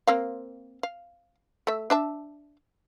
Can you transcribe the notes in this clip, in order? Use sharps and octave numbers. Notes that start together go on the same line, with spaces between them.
A#3 C4 F5
F5
A3 E5
D4 E5 A5